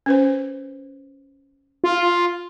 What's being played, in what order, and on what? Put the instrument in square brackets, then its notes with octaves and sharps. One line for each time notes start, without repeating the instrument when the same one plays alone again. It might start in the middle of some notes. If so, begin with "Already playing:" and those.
[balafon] C#4 B4 C5
[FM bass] F4